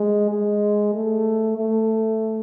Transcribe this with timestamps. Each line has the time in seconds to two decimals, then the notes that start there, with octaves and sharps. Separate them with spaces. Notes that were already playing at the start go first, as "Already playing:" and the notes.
Already playing: G#3
0.31 G#3
0.94 A3
1.57 A3